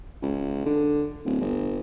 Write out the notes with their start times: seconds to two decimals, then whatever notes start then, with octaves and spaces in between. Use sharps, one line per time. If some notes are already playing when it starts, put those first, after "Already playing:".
0.23 C#2
0.66 D3
1.25 D1
1.41 G1